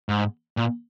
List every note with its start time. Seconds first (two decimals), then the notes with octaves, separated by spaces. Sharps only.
0.09 G#2
0.57 A#2